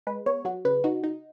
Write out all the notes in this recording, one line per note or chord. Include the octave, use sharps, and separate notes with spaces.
G#3 B4
B3 C#5
F#3 F#4
C#3 B4
D#4 F#4
D#4